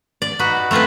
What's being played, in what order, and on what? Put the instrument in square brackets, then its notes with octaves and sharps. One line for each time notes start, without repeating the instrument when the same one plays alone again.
[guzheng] D5
D#4 F#4 B4
A3 C4 F4 G#4 B4